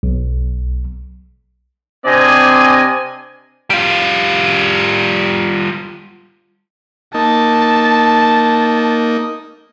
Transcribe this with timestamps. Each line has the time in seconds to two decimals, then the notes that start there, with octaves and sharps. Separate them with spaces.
0.03 B1
2.05 C3 C4 D4 D5 D#5 G#5
3.70 G3 F4
7.14 A#3 D#4 A5